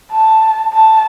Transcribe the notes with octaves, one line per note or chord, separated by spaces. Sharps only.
A5
A5